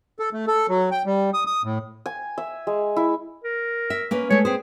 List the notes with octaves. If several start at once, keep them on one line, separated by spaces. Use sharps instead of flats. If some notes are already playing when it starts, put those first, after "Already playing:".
A4
A3
A4
F#3
G5
G3
D#6
D#6
A2
G#5
E5
G#3
E4
A#4
E5
A#3 C#4 B4
G#3 A3 C#5
C4 G#4 B4 C5